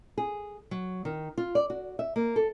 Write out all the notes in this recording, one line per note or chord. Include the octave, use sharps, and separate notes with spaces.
G#4
F#3
D#3
F4
D5
F#4
E5
A#3
A4